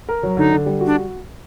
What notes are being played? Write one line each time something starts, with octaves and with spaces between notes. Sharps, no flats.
A#4
F#3
D3 D#4
D3
G3
F#4
D4